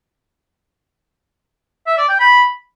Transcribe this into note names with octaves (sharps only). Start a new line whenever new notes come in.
E5
D5
G5
B5